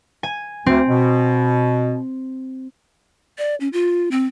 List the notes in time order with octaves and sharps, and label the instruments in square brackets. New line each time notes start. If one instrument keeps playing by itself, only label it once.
[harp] G#5
[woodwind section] D2 [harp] C4
[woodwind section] B2
[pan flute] D5
C#4
F4
C4